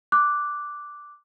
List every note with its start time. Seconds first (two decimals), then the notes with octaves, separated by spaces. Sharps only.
0.12 D6 F#6